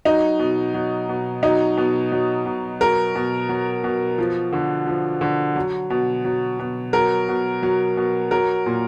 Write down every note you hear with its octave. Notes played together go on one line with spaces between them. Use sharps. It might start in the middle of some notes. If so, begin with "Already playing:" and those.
F#3 D#4
B2
F#3
B2
F#3 D#4
B2
F#3
B2
F#3 A#4
B2
F#3
B2
F3
D3
F3
D3
F#3
B2
F#3
B2
F#3 A#4
B2
F#3
B2
F#3 A#4
A#2